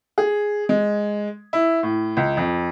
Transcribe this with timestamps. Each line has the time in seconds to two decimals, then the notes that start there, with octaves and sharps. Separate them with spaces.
0.18 G#4
0.69 G#3
1.53 E4
1.83 A2
2.17 C#2
2.37 F2